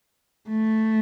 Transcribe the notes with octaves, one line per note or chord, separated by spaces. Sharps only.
A3